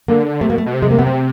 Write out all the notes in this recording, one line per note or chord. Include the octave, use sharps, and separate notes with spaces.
D3 A#3
C3 A3
B2 A#3
A3
B2
C3
G#3
A#3
B3
C4